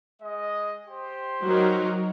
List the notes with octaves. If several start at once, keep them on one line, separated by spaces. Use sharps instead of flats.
G#3 D#5
G4 C5 C6
F#3 D#4 A#4